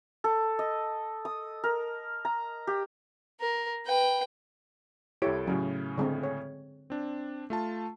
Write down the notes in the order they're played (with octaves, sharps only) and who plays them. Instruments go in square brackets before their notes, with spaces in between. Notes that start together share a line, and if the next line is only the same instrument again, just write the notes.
[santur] A4
D#5
D#6
A#4
A#5
G4
[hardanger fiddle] A#4
B4 G5
[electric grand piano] C2 A4 D7 [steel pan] E4 G4 C#5
[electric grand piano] A2 C#3 C#4 [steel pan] F#3
[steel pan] D3 G#3 C4
C#5
[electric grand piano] C4 D4
A3 F4 A5